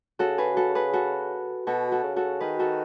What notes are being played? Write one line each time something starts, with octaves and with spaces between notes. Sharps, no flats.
C#3 F#4 A4
G#4 B4
F#4 A4
G#4 B4
F#4 A4
B2 F#4 A4
F#4 A4
C#3
F#4 A4
D#3 G#4 B4
F#4 A4